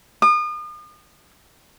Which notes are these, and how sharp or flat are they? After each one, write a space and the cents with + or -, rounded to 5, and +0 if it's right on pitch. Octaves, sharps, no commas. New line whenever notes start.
D#6 -40